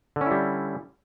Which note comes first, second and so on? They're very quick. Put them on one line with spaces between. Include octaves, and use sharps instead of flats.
D3 C#4 E4 G3